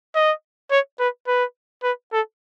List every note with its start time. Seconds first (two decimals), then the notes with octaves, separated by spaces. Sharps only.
0.15 D#5
0.71 C#5
1.00 B4
1.27 B4
1.83 B4
2.12 A4